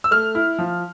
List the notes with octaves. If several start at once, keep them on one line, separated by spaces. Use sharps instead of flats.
E6
A3 F6
E4
F3